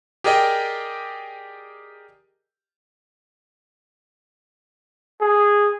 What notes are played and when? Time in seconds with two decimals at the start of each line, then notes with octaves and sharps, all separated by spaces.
0.24 G4 G#4 A#4 D5 D#5 G5
5.21 G#4